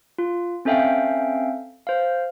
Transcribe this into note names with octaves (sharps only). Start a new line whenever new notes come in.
F4
C4 C#4 A4 E5 F5 G5
C5 F5